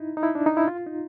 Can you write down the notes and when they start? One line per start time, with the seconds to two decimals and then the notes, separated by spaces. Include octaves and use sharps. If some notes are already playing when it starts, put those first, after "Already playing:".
Already playing: D#4 E4
0.17 D#4
0.23 E4
0.35 D4
0.46 D#4
0.57 E4
0.67 F4
0.86 D#4